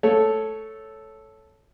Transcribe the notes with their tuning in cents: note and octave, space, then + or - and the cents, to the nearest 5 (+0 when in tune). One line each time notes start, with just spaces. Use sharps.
A3 -10 C#5 +0